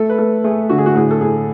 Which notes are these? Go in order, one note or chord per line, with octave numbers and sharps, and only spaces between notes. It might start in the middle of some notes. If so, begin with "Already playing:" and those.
Already playing: A3 A4
B4
A3 A4
A3 G#4
D3 F#4
G#4
F#4
A2 G#4
A4
A2 G#4